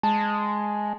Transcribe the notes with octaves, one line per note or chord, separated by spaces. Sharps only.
G#3 A5